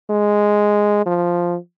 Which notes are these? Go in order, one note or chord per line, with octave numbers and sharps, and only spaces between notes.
G#3
F3